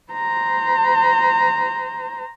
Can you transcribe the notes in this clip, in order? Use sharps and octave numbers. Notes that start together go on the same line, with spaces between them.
C5 A#5